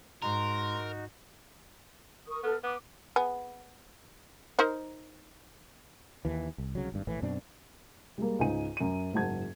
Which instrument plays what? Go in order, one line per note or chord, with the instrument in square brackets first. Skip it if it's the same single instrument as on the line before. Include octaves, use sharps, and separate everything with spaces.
[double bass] G#2 [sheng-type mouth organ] D#4 F#4 [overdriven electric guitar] A#4 [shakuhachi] C6
[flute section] A#4 C#6 D#6
[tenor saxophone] B3 [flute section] A4 F6
[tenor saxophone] B3 [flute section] D6
[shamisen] B3 G#4
D#4 A#4 C5
[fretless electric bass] D#2 E3
C2
C2 C#3 F#3
G#1 G2
A#1 A2 E3
F#2 B2 C4 D4
[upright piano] G3 G#3 A#3
C#2 G#2 D#4 G#5 D#7
F#2 D#7
F#1 G#2 F#3 A5 G#6